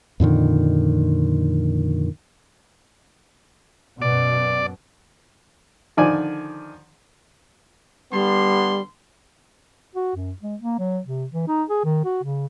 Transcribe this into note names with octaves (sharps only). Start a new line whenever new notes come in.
F2 A#2 D3 D#3
F#2 B2 D5
D3 D#3 F3 D5 G#5
D3 G3 B3 C6
F#4
F#2
G#3
A#3
F#3
C3
E3
D#4
G#4
D#3
F#4
C#3